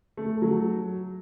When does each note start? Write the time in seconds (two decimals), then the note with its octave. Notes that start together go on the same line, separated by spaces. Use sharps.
0.17 A3
0.42 F#3